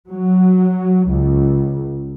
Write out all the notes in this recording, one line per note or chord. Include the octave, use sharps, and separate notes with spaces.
F#3
C#2